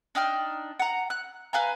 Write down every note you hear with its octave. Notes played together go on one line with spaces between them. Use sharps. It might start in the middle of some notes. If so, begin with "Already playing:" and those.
D4 D#4 G5 F6
F#5 A#5
F#6
B4 F5 G#5 A#5